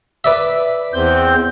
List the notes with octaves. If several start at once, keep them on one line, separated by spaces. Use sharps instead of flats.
B4 D5 E5
E2 C4 G6